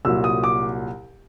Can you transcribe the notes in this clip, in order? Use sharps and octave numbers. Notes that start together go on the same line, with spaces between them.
C2 A#2 F#3 E6
D#6
D6